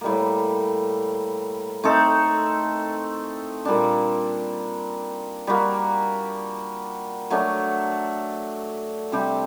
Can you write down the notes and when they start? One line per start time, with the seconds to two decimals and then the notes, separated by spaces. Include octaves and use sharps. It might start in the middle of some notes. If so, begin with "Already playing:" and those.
0.01 A2 G3 A#3
1.84 A3 C4 D#4 A4
3.65 A#2 G3 A#3 D4
5.47 G3 A#3 F#4
7.30 F#3 A3 D4
9.12 C3 G3 D4 G4